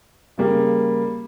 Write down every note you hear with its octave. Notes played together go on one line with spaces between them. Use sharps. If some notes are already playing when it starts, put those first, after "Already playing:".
C#3 G3 A#3